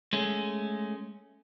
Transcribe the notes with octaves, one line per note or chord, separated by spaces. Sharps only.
G#3 A3 C#4